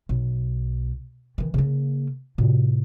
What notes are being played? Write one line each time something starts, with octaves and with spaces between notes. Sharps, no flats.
B1
D#3 E3
C#3 A#3
A2 C3